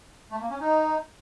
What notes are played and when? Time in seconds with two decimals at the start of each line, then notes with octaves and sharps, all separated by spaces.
0.31 A3
0.41 A#3
0.50 C#4
0.61 D#4